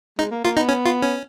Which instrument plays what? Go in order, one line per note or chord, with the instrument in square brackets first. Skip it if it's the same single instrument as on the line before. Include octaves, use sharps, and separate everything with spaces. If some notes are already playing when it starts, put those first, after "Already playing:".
[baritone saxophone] G#3 [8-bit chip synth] D#4
[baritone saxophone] A#3
[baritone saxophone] A#3 [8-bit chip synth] F4
[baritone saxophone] B3 [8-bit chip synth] D#4
[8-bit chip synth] C#4
F4
C#4